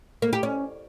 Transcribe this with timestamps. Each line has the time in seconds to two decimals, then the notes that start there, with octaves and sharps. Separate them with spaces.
0.22 A#3
0.33 G4
0.43 C#4